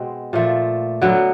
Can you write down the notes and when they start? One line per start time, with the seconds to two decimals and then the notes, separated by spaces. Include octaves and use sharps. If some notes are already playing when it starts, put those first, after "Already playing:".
Already playing: B2 G#3 C4
0.33 A#2 F3 A3
1.02 D3 F#3 B3